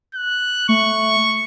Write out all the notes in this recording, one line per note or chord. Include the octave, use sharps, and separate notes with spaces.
F#6
A3 C#6